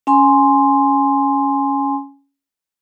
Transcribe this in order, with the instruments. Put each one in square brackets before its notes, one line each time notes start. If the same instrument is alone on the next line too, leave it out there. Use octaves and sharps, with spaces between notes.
[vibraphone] C#4 G#5 C6